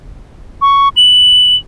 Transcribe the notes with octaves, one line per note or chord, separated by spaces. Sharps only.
C#6
F#7